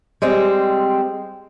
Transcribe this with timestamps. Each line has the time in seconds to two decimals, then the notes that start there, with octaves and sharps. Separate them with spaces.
0.22 G3 G#3 C4